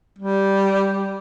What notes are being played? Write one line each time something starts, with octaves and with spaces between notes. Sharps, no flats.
G3